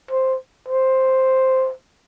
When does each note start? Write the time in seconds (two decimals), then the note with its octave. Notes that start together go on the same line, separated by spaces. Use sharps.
0.11 C5
0.69 C5